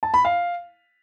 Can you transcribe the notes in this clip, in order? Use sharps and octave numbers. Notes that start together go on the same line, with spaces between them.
A5
B5
F5